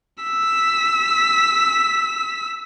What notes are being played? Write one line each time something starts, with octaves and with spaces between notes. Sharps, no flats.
E6 B6